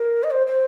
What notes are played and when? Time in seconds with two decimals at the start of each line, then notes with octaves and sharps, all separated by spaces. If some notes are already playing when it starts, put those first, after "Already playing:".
Already playing: A#4
0.23 D#5
0.31 C5
0.47 C5